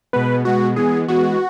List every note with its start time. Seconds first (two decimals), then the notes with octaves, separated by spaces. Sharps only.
0.13 B2 G#3 B3 B4
0.45 B2 G#3 B3 F#4
0.76 E3 G#3 B3 G#4
1.08 E3 G#3 B3 F#4